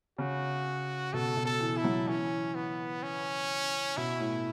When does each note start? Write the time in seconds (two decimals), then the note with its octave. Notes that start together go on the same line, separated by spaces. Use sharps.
0.18 C#3 F#4
1.13 B2 A4
1.37 B2
1.45 A4
1.60 E3
1.77 E4
1.84 F#3
2.08 E3 C#4
2.55 B3
3.03 C#4
3.97 B2 E4
4.20 A2